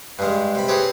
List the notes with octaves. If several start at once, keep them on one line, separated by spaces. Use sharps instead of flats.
G2 G#3
C3 B5
C4 G4 G#4 B4 C#5